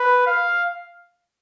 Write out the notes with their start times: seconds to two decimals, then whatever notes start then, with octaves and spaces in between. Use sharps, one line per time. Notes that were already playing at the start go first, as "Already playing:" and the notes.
Already playing: B4
0.26 F5